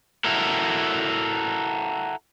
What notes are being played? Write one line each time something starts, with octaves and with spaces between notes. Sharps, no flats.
E4 F#4 A4 A#4